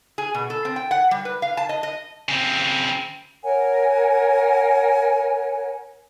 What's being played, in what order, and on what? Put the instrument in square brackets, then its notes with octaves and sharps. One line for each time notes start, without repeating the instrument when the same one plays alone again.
[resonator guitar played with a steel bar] G#4
B2
A4
C4
G5
F#5
G3
B4
F5
A5
D#5
D#5
[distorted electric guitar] C#3 C4
[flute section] A#4 C#5 F#5 G#5